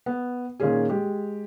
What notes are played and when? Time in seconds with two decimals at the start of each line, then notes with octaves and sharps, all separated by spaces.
0.06 B3
0.60 A#2 D#3 A#3 C#4 G#4
0.89 G#3 G4